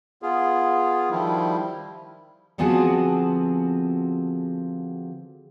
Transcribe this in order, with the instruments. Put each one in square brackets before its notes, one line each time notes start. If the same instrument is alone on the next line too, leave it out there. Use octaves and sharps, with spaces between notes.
[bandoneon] B3 F4 G#4
D#3 F3 G3 E4
[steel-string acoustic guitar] D3 F3 B3 C4 F#4 G#4